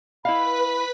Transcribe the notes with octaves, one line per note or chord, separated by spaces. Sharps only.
E4 B4 D#5 F5 B5 B6